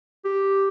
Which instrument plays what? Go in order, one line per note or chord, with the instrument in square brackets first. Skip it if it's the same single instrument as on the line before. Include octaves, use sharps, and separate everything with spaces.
[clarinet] G4